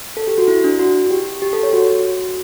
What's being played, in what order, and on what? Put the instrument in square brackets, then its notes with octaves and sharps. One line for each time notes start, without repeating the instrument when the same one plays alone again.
[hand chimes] A4
G4
F#4
E4
D4
F#4
G4
G4
A4
C#5
F#4